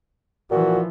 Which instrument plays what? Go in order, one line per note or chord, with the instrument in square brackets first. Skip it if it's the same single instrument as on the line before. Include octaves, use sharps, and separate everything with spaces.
[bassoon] A#2 [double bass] E3 F3 [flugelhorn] F#4